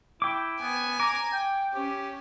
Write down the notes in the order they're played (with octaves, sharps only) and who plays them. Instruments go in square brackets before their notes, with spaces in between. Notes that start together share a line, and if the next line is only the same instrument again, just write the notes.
[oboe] E4 [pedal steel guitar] G5 D6
[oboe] B3 [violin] G#5
[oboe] A#5 [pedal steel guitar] D6
[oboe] G5
[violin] C#4 [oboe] G4